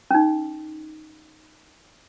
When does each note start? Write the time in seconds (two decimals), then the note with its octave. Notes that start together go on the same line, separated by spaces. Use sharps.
0.11 C#4 D#4